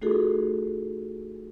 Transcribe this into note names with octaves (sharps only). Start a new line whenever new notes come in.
A3 D#4 F4 F#4 G#4 A4